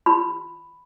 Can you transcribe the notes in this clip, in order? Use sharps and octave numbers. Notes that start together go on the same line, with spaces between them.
B5